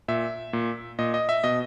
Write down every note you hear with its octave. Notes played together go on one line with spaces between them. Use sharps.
A#2 E5
A#2
A#2 D#5
D#5
E5
B2 D#5